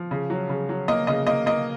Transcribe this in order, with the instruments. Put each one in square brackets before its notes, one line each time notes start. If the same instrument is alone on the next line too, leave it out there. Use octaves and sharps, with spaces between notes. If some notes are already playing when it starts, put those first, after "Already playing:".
Already playing: [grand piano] F3
C#3
F#3
C#3
F#3
A#3 D#5
C#3 D#5
A#3 D#5
A#3 D#5